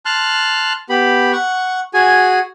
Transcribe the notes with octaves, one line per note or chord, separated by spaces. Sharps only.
A5 C6 F6 F#6
B3 G4 B5
F#5 C#6
F#4 G#4 G#5